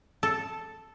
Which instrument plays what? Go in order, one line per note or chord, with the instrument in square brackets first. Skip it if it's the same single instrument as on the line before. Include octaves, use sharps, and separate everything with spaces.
[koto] A4